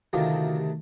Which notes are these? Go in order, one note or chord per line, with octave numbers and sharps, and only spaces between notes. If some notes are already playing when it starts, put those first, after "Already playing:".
D2 C3 D#3 F#3 A3 F4 G4